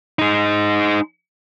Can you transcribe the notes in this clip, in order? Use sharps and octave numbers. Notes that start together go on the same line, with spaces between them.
G#3 D#4